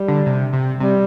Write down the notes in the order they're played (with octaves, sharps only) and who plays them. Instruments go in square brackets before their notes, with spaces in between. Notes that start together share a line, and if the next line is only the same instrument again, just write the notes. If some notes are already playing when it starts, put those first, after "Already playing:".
Already playing: [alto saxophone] G3
[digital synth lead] D3
C3
C3
[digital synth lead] C3 [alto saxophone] G3